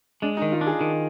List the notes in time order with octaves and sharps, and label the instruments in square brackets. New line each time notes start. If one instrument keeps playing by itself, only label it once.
[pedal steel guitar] G#3 [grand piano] D4
[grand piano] D#4
[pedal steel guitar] D#3
[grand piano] F4
[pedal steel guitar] D4
[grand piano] G#4
[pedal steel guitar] D#3